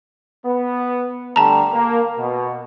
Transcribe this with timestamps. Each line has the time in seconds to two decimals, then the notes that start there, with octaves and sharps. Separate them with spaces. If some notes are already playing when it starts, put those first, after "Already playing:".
0.46 B3
1.36 D3 G3 A3 A5 A#5
1.73 A#3
2.18 B2